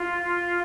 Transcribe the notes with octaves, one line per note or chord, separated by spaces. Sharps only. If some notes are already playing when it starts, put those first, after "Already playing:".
Already playing: F4